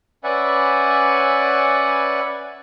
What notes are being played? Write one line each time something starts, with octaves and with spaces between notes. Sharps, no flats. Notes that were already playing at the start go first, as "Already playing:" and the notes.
C#4 B4 D5 E5 F#5 G#5